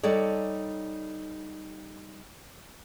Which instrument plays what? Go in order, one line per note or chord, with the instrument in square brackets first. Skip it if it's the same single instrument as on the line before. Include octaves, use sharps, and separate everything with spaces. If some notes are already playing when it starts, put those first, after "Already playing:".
[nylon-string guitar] G3 D#4 A4 C#5 D5